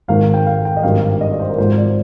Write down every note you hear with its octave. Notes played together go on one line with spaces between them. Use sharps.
G#1 G#2 D#3 F5
G5
F5
G5
D#5
G#1 G2 D#3 F5
D#5
D5
C5
A#4
G#1 G#2 F3 C5
D5